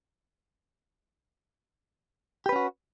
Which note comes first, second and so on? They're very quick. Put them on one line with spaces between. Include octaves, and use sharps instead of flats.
G4 B4 C#4 F#4